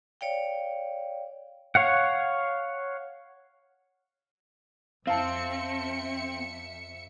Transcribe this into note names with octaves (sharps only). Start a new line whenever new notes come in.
C#5 D5 F5 G5
C#5 F5 F#5
F2 C4 E5 F5 A5 C#7